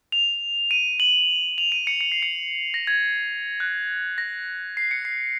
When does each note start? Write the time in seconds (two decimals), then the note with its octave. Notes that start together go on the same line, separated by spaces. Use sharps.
0.12 F7
0.71 D#7
1.00 F#7
1.58 F7
1.72 D#7
1.87 C#7
2.01 C#7
2.12 C7
2.22 C#7
2.74 A#6
2.87 G#6
3.60 F#6
4.18 A#6
4.77 C7
4.91 C#7
5.05 C7